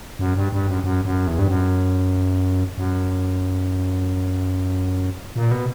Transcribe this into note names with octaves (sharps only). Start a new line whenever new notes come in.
F#2
G2
G2
F#2
F#2
F#2
E2
G2
F#2
F#2
A#2
B2